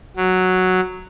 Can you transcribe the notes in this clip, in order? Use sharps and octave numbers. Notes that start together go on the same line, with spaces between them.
F#3